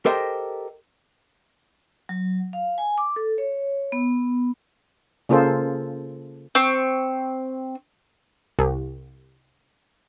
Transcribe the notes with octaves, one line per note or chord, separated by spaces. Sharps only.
G4 A4 A#4 C5 D#5 G5
F#3
F5
G#5
D6
A4
C#5
B3
C#3 A#3 F4 G#4 A4 C5
C4 C#6
C2